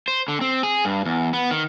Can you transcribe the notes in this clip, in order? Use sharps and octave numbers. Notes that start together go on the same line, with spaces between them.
C5
D3
C4
G#4
G2
E2
B3
D#3